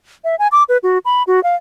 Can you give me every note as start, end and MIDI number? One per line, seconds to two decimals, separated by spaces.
0.24 0.35 76
0.39 0.48 80
0.52 0.63 86
0.69 0.78 71
0.83 0.98 66
1.05 1.23 83
1.27 1.43 66
1.43 1.56 77